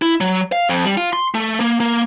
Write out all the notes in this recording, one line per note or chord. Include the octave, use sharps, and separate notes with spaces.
E4
F#3
F5
F2
G3
F4
C6
A3
A#3
A#3